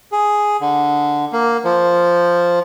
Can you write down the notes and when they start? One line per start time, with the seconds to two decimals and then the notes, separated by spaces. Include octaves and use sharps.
0.12 G#4
0.61 D3
1.33 A#3
1.65 F3